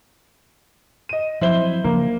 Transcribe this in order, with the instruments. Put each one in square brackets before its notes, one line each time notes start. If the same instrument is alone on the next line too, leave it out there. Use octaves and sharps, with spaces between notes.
[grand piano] D#5 D#7
[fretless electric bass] F3 F#3 C4 [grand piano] E4 C5 G7
[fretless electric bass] C#3 F3 D4 [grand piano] A#3